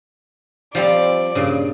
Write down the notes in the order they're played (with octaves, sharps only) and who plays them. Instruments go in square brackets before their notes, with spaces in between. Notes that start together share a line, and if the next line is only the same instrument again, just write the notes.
[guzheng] F3 G3 C4 [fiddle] D5
[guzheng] G2 A#2 C#3